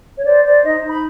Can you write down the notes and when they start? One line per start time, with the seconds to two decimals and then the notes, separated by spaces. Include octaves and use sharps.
0.16 C#5
0.25 C5 D5
0.44 C5 D5
0.63 D#4 D#5
0.82 D#4
0.90 B5